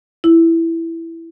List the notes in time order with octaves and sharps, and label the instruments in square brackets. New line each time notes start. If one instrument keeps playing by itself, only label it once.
[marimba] E4